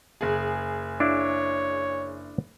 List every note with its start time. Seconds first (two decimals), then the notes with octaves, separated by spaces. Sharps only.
0.21 F#1 G#4
1.00 D4 E4 C#5 F5